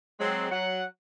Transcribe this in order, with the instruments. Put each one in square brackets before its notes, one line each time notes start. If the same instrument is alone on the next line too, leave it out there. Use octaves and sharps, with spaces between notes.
[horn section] F#3 G#3 C4
F#3 F#5